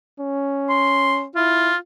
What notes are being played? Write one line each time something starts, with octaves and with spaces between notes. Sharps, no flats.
C#4
C6
E4 F4